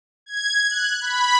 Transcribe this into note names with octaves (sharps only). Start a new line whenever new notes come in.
G#6
F#6
B5